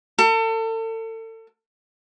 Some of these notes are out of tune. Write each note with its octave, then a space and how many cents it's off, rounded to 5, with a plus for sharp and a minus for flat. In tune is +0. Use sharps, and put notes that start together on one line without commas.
A4 +35